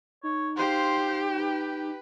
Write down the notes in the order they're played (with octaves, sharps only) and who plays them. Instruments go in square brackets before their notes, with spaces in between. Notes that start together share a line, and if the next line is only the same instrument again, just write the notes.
[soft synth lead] D#4 [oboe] C#5
[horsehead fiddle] G4 [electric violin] C5 F5 [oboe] C6
[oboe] G5
[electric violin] B4